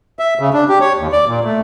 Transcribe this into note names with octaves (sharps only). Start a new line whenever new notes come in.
E5
C#3
D4
G4
C#5
D#2
D5
A#2
A3